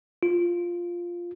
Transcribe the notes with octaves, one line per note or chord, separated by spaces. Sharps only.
F4